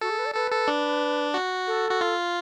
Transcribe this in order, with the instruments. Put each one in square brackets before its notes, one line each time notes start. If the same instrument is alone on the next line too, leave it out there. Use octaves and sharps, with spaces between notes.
[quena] F#4 [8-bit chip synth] A4
[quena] G#4
B4
D5
[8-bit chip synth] A4 [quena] B4
[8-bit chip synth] A4
D4
F#4
[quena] A4
[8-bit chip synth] F#4
F4